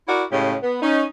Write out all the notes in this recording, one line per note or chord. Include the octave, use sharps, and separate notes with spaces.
E4 F#4 A#4 D5
A2 C#3 G#3 C#4 G4
B3
C#4 D#4